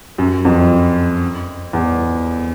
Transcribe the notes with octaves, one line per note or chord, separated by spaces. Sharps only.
F#2
F2
E2